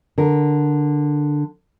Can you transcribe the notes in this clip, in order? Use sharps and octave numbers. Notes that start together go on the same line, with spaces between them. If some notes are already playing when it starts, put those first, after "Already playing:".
D3 A#4